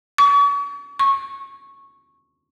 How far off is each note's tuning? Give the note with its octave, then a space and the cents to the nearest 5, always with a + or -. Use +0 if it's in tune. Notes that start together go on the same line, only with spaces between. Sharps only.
C#6 +40
C#6 -15